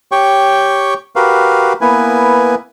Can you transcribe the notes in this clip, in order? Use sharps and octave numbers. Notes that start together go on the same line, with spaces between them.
G4 C#5 G5 C#6
F#4 G4 A#4 B4 F5
A#3 B3 E4 B4 G#5